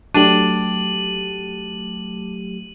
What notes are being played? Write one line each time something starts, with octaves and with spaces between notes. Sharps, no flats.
F#3 A3 D4 G4 D#7 F#7